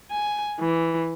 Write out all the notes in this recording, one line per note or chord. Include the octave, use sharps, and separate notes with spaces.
G#5
E3